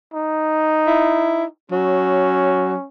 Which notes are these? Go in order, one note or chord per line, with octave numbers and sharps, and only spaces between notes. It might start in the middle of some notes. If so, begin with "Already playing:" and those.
D#4
E4
F#3 C#4